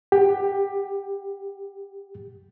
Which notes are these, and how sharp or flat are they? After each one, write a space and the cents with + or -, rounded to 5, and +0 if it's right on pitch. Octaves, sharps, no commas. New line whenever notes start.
G4 +15 F#5 +30